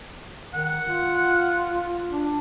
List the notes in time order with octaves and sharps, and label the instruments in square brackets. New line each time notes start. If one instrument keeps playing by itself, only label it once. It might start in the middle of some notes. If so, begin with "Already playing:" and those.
[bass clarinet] D#3 [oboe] F#5
[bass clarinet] F4
D4